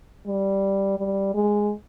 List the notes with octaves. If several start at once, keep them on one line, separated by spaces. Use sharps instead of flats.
G3
G3
G#3